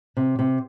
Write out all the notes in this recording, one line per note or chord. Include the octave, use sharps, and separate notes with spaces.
C3
C3